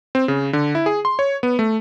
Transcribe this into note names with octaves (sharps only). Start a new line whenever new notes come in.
C4
C#3
D3
E4
G#4
C6
C#5
B3
A3